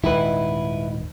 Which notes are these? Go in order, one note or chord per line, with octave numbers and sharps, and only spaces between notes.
D#1 G#2 D#3 E4 B4